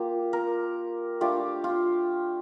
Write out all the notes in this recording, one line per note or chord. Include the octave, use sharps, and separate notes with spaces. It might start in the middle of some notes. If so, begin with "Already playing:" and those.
Already playing: A#3 F4 G4
A#4
A3 D4 F4 G4
F4